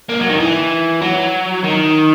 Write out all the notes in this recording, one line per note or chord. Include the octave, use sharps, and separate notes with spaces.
A#3
F#3
D#3
E3
F#3
D#3